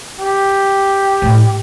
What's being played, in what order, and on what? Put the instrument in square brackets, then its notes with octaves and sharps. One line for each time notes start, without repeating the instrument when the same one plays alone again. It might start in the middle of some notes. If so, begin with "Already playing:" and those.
[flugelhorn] G4
[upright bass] A2